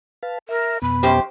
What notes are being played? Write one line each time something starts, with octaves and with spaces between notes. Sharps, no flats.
B4 F5 A5
A#4 E5
F2 B2 B3 B5
F#2 G4 C5